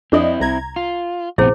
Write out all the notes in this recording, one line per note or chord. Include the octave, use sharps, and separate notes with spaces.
F2 C4 D4 E4 D#5
C2 A#5 G#6
F4
A#1 F2 C3 B3 E4 G#4 C5